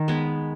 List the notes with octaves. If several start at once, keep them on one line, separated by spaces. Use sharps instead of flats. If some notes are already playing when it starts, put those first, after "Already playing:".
Already playing: D#3
G#3 B3